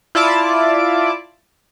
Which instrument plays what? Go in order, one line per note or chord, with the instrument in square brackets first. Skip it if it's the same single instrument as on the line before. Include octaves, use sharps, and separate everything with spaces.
[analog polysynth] E4 F4 D5 A5 D6